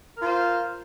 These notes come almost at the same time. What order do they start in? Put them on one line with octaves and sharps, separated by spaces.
A#4 F4 C5